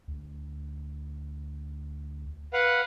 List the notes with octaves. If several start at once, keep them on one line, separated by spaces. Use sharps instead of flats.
D2
B4 F5 F#5